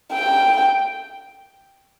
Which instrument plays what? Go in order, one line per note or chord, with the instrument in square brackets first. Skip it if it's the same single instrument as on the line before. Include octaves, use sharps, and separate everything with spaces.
[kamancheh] G5